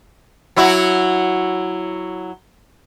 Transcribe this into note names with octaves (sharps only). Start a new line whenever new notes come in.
F#3 E4 F#4